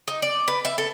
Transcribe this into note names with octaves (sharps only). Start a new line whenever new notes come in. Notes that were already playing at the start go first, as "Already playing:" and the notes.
D#4
D5
B4
E5
A4